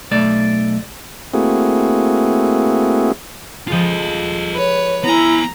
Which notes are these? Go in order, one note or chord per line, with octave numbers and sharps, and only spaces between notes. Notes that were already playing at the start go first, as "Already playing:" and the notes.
B1 A3 D5
A3 A#3 C4 E4 F#4 G#4
F3 G#3 F4 A4 D#5
B4 C#5
B3 E4 G#5 A#5